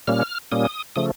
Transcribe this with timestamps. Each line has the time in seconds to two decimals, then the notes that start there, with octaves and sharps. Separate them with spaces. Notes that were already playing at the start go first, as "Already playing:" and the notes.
0.07 A#2 G3 A#3 C#4 F6
0.52 A#2 G3 A#3 C#4 D#6
0.96 C#3 F3 A3 D#6